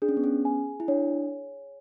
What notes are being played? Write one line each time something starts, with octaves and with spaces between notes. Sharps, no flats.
D4 G#4
C#4
B3
C#4
G#5
E4
D4 C#5